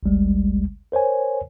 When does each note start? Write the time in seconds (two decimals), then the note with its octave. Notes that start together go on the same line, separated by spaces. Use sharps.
0.03 G#1 D2 G3 G#3
0.92 A#4 C5 C#5 G#5